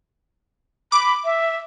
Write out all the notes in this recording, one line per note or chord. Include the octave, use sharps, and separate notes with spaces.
B5 D6
E5